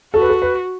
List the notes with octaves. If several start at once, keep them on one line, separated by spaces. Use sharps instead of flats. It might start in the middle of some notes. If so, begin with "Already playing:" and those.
F#4 A4
B4
A4
B4